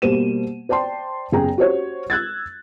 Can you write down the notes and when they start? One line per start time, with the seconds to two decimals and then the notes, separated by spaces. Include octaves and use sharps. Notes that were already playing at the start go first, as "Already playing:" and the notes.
0.02 B2 G3 A#3 C5 D#7 E7
0.69 C5 D5 G5 A5 C6
1.32 F#1 B3 G#4 G5 A#5
1.58 F#4 G4 C5 C#5
2.10 E6 F#6 G#6 A6